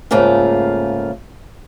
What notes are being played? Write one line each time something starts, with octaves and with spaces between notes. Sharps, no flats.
G#2 C#3 A3 A#3 F4